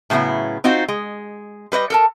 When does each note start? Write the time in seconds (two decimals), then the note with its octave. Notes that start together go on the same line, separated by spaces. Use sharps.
0.10 A2 C#3 F#3 B3 E4
0.64 C4 D#4 F4 F#4
0.88 G#3
1.72 G3 B4 C#5 D#5
1.90 A4 A#4 A5